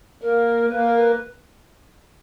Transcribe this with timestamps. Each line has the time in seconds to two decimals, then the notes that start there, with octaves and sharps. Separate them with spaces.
0.21 A#3 A#4
0.69 A#3 B4
0.83 A#4
0.96 B4